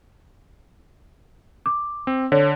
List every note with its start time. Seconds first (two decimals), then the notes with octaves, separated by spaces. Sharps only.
1.66 D6
2.07 C4
2.32 D3 C#5